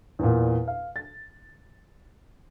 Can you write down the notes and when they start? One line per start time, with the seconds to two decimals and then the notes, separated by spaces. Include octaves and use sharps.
0.19 E2 A#2
0.68 F5
0.96 A6